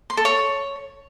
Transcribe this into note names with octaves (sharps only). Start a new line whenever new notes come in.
C6
A4
C#5